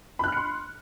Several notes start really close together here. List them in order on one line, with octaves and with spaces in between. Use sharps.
B5 F#6 F6 C#7 C6